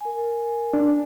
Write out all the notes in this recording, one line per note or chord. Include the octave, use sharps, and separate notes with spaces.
A#4 G#5
D4